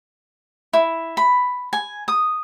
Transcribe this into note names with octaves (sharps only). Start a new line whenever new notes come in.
E4
B5
G#5
D#6